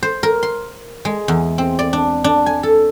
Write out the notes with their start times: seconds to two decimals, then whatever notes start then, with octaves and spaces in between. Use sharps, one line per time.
0.03 C5
0.23 A#4
0.43 C6
1.05 G#3
1.28 E2
1.58 C4
1.79 D5
1.93 D4
2.24 D4
2.46 G#5
2.63 A4